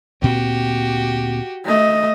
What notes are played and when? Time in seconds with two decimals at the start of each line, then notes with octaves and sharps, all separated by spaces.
0.22 D2 A#2 C4 F#4 G4
1.65 A3 D#5